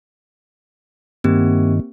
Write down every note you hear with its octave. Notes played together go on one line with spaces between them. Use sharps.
G2 D#3 A#3 C4 G4